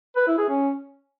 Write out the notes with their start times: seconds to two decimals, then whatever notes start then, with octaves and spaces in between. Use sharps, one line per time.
0.16 B4
0.27 E4
0.38 G#4
0.49 C#4